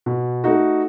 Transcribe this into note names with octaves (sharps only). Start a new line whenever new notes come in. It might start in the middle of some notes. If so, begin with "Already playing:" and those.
B2
A3 D#4 F#4